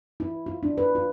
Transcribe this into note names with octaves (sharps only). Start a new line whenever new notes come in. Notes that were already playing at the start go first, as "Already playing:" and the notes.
E4
F4
D4
B4
F4